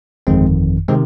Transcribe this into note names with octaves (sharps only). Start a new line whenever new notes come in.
G1 F2 D#3 G#3 C4
C3 D#3 G#3 C4